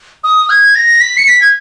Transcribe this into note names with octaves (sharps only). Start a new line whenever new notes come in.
D#6
G#6
A#6
B6
C#7
B6
G#6